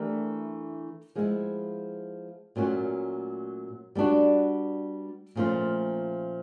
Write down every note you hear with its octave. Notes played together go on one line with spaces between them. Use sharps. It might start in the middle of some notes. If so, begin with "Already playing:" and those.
Already playing: E3 A3 D4 G4 A#4
F3 G#3 B3 E4
A#2 F#3 A3 C#4 F#4
G3 B3 D4 F#4
A#2 F3 A3 C#4 F4